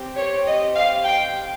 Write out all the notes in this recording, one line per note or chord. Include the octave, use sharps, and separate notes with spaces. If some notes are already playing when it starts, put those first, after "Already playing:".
Already playing: C4 G4
C#5
D#5
F5
G5